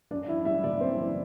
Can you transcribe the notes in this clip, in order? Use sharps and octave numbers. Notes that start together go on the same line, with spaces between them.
F#2 D4 D5
E3 E4 E5
G3 E4 E5
F#1 D4 D5
F#2 C4 C5
E3